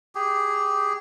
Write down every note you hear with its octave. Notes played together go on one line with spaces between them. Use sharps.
G4 G#4